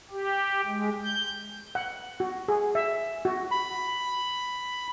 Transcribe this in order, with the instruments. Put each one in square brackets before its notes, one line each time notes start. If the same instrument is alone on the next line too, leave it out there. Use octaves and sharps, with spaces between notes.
[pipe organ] G4
G#3
G6
[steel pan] F#5
F#4
G#4
E5
F#4
[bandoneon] B5